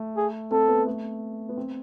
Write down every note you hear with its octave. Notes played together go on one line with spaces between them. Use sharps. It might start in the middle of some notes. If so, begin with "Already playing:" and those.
Already playing: A3
G#4
C4 A4
B3
A3
B3
C4